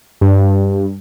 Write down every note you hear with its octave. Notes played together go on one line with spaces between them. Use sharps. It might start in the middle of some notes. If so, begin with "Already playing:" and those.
G2